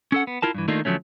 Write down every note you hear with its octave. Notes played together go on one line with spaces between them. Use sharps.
C#4 A4 F#5
B3
E4 F4 A#4 A5
G2 E3
D#3 A3 A#3 D4 D#4 F4
D2 F3 F#3 A3 C#4